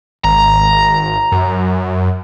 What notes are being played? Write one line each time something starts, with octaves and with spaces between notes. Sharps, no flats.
G#1 A#5
F#2